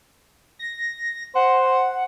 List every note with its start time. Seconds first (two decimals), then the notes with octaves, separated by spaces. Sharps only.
0.59 A#6
1.35 C5 F#5